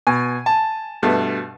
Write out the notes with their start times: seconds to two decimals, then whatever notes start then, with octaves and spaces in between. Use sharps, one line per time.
0.07 B2 G#5
0.46 A5
1.03 G2 B2 A3